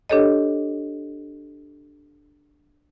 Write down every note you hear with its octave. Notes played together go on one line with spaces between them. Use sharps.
D4 G4 A4 C#5 D#5